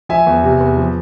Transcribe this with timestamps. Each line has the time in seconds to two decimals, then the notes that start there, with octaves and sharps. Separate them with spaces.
0.09 F3 E5 G#5
0.26 E2
0.44 C3
0.61 E2
0.77 F3